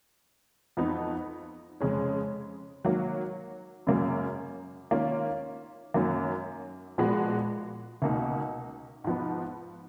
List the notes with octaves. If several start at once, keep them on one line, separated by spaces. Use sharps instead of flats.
F2 F3 B3 D#4
F2 C#3 G#3 C#4
D#3 F#3 A#3
F#2 C#3 F#3 A#3
D#3 A#3 C#4 F4
F#2 D#3 F#3 A#3
A#2 F3 G#3 B3 F#4
C#2 B2 A#3 D#4
G#2 F3 B3